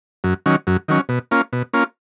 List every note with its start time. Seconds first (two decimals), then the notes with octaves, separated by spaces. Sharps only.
0.24 F#2
0.46 D#3 F#3 C#4
0.67 F#2
0.88 D#3 F#3 C#4
1.09 B2
1.31 A#3 C#4 F4
1.53 B2
1.74 A#3 C#4 F4